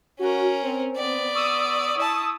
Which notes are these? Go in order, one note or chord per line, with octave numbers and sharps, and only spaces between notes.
C#4 F#4 A#4
C4
B3 D5
C#6 D#6 E6
E4 A5